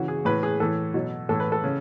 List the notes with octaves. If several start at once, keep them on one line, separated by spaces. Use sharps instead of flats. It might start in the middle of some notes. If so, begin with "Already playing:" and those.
Already playing: C#3 E3 F#4
G#4
A2 E3 B4
G#4
A2 E3 A4
B2 F#3
A2 E3 A4
B4
A4
C#3